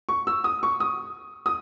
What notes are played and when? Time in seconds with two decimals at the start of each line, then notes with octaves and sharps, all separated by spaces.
0.09 C#6
0.27 E6
0.44 D#6
0.63 C#6
0.80 D#6
1.46 D#6